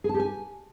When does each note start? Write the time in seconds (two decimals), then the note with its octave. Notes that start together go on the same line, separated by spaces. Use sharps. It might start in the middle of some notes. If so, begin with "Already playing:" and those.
0.04 G#4
0.09 A5
0.14 G4
0.19 G#5